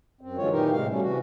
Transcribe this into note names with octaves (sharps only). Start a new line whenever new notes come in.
F#2 C4
D3 E3 F#3 G#3 F4 C#5
A#2 D#3 E3 D#4 G4 A#4
A2 C3 G#3 F5
B2 G3 A3 C#4
C3 E3 F#4